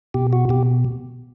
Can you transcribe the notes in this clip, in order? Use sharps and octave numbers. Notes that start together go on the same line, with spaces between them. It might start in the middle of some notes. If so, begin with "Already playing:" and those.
B2 G4
F#4
B2 G4